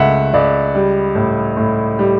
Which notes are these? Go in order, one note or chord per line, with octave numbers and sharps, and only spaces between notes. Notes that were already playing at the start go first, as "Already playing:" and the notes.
Already playing: C#2 A3 E5 F#5
C#2 D5
G3
A2
A2
G3